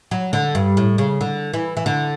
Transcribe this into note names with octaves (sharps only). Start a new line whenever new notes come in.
F#3
D3
G2
A2
C#3
D3
E3
E3
D3